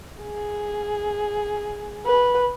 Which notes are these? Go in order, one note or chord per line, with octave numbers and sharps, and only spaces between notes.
G#4
B4